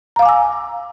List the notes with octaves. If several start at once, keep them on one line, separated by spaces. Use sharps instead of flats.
F5 G#5 A#5 D6 E6